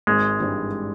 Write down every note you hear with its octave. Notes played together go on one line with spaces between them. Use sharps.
G#1 G#3
G2 E3 G3